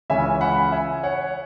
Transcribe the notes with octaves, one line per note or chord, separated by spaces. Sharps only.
C#2 C#3 E3 C#4 E5 G#5
F#5 B5
E5 G#5
C#5 F#5